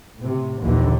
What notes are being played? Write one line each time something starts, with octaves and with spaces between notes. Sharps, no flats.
A2 C3
A#1 D#2 D3 E3